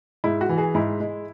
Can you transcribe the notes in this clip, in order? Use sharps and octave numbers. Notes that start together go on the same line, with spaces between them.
G#2 E4
F#4
E3
G#4
G#2 E4
G#3